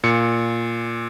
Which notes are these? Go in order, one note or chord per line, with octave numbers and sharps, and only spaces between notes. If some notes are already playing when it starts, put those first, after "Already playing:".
A#2 C#7